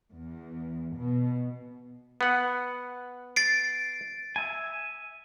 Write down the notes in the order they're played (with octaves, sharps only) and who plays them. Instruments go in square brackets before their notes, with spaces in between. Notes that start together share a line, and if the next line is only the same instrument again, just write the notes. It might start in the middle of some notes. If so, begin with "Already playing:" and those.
[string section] E2
B2
[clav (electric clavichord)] B3 F#5
[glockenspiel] A6 C7 D7
[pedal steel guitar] E5 G#5